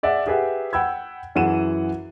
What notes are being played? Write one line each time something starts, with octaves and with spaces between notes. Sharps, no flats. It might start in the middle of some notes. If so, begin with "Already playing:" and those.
G#4 D5 E5 F#5
G4 G#4 B4 E5 F#5
F#5 G5 B5 E6 G#6
F#2 E3 G#4 F#5 D#7 E7